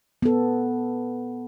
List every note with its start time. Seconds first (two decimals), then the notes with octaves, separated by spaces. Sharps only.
0.22 B3 A4